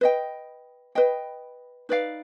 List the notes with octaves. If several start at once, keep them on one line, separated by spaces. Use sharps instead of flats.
B4 D#5 G5
B4 D#5 G5
D#4 B4 D5 F5